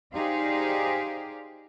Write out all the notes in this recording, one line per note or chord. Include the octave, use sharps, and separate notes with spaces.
D#4 G4 G#4 C5 D5 F5